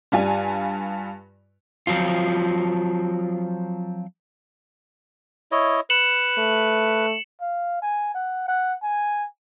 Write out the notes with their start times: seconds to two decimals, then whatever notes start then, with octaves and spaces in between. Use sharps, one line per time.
0.12 G2 G3 F4 G#5
1.87 F3 F#3 C4 F4
5.52 E4 C#5 D#5
5.90 B4 C#7 E7 F#7
6.38 A3
7.41 F5
7.82 G#5
8.15 F#5
8.48 F#5
8.83 G#5